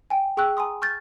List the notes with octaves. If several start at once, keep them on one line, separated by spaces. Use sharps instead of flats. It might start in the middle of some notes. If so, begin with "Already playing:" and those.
G5 G#5
G#4 G5 C#6 E6 F#6
G#5 A#5 C6 D#6
C#6 F6 G6 A6